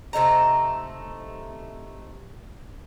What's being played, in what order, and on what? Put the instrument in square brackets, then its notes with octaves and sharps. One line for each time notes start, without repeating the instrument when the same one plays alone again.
[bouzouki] C3 A3 D#4 A#5